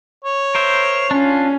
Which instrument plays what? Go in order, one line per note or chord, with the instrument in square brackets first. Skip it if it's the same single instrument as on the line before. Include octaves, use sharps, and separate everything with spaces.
[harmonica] C#5
[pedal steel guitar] A#4 C5 E5
[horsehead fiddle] C#4 [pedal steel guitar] D4 F4